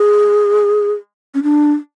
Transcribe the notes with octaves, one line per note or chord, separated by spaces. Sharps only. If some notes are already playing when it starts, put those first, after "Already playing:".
Already playing: G#4
C#4
D4